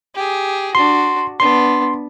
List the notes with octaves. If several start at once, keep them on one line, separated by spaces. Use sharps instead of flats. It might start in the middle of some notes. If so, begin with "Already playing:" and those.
G4 G#4
D4 F#4 C6
B3 D4 C6